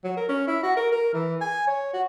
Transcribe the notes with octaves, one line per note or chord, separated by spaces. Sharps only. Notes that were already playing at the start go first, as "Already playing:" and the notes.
F#3
A#4
C#4
E4
F#4
A#4
A#4
E3
G#5
C#5
F#4